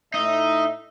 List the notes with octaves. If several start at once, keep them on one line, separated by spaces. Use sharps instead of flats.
A2 D#4 E5